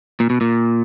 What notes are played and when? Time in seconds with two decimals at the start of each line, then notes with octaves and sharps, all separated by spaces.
0.20 A#2
0.30 B2
0.41 A#2